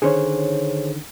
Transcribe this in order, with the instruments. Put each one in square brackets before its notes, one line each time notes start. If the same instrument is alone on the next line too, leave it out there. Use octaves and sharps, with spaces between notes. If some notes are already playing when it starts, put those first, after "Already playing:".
[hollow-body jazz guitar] D3 D#3 C#4 [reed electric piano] G#4 C5 C#5